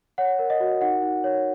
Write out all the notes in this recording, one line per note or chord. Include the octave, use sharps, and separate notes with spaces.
C#5 F#5
A#4
D#5
F#4
D#4 F#5
D#4
C#5